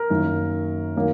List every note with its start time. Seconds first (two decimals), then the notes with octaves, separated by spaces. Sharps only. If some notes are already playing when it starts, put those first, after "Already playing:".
Already playing: A#4
0.10 F#2 D#3 A#3
0.96 D#3 F#3 A#3